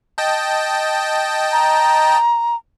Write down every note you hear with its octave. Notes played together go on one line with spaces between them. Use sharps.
D#5 G5 A5
A#5